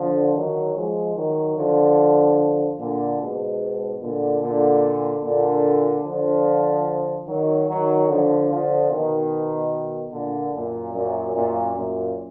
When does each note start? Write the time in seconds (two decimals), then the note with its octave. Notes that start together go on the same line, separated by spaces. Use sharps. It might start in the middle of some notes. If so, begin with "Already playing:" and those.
Already playing: D3 F3
0.34 D#3 F#3
0.75 F3 G#3
1.16 D#3 F#3
1.57 D3 F3
2.79 A#2 D3
3.19 G#2 B2
4.01 A#2 D3
4.41 A#2 D3
5.23 A#2 D3
6.05 D3 F3
7.27 D#3 F#3
7.67 D#3 F#3
8.09 D3 F3
8.49 D3 F3
8.90 B2 D#3
10.12 A#2 D3
10.53 F#2 A#2
10.94 F#2 A#2
11.35 F#2 A#2
11.75 F#2 A#2